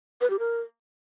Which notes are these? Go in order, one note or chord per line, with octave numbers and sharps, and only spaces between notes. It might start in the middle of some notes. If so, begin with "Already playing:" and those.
B4
G4
A#4